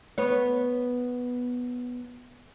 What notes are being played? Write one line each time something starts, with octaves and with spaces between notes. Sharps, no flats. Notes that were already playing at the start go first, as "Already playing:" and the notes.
B3 C#5